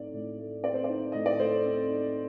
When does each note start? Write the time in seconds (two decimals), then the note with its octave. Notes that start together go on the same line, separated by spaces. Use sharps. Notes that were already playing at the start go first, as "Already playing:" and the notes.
Already playing: A2 A3 C4 D#4 D5
0.14 A2
0.38 A3
0.63 C4 D5
0.74 C5
0.84 D#4 D5
1.12 A2 D#5
1.26 D5
1.39 A3 C5
1.65 C4
1.90 D#4